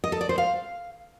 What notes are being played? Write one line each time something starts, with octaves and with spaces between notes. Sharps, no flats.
D#5
A4
D5
C5
F5